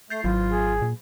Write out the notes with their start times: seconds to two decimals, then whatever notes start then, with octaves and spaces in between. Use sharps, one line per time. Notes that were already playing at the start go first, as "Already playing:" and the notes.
0.10 A3 G6 A6 C7
0.24 G#1 F#3 F4
0.47 G#4
0.82 A#2